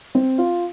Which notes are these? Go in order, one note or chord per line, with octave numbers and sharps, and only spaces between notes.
C4
F4